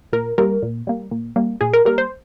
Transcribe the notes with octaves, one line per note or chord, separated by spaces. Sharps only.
A#2 A#4
G3 A#3 A#4
A#2
G3 A#3
A#2
G3 A#3
A#2 G#4
A#4
G3 A#3 A#4
C5